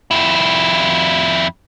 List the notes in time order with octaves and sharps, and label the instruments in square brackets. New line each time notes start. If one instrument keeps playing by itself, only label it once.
[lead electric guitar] F2 E4